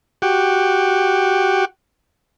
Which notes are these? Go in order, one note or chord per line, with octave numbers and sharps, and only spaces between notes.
F#4 G4